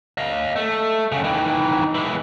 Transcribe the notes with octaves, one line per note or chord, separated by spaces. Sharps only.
D#5 F5
A3
F#2 C#3
D#3 E3
E3 G#3